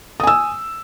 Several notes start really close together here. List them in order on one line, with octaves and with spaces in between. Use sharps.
D#6 G#5 E6